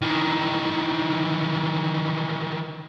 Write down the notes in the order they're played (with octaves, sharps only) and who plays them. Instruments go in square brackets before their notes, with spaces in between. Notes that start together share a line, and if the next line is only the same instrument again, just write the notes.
[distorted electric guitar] D#3 E3